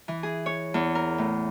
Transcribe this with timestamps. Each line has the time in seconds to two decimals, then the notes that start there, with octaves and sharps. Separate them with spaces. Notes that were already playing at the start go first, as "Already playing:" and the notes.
0.08 E3
0.23 G#4
0.46 C#5
0.74 E2
0.95 A#4
1.18 A2